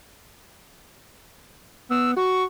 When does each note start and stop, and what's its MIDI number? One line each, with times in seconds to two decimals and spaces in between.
1.90 2.14 59
1.90 2.12 88
2.17 2.45 66
2.17 2.44 85